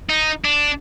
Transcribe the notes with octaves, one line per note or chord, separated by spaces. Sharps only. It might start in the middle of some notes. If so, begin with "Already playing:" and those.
D#4
D4